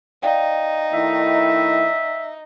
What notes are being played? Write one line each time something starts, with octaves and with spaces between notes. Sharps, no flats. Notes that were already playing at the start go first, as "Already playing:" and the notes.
D#4 D5 F5 G5
D#3 A3 E4 E5